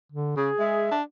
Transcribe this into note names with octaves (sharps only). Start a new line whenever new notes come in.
D3
C#3 G#4
G#3 E5
D4